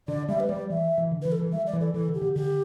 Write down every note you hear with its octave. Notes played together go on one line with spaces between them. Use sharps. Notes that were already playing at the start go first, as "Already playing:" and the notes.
D3 D5
G3 E5
B4
G3 D5
E3 E5
E3
D3
B4
E3
A4
E3
G3 E5
D5
E3
A4
E3 A4
D3
G4
D3
D3 G4